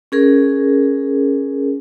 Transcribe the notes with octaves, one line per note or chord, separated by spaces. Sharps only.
C#4 G#4 A#4